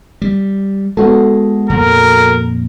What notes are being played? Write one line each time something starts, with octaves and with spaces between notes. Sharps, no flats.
G3
G#3 B3 F#4 A4
F2 A#2 A#4